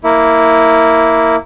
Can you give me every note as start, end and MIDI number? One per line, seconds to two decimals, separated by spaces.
0.04 1.36 58
0.04 1.36 64